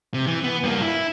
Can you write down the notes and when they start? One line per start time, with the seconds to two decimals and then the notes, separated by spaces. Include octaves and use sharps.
0.14 C3
0.27 E3
0.44 B3
0.63 G2 A#3
0.82 E4